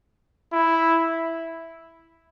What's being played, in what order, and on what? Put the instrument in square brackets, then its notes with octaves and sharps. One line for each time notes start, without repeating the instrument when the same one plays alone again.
[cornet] E4